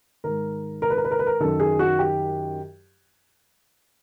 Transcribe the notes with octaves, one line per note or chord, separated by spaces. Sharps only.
G#2 D#3 A#4
A#4
B4
A#4
B4
A#4
B4
A#4
F#2 D#3 A4
G#4
F#4
G4